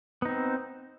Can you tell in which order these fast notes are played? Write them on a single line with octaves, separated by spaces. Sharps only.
B3 D#4 C4